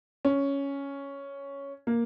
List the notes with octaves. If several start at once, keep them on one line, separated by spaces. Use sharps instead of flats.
C#4
A#3